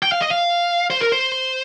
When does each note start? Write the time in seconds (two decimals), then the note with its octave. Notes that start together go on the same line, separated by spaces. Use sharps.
0.03 G5
0.12 F5
0.21 D#5
0.30 F5
0.90 C5
1.01 A#4
1.12 C5